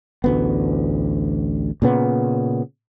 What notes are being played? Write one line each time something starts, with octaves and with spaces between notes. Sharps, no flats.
A1 D2 B3
A#2 C#3 B3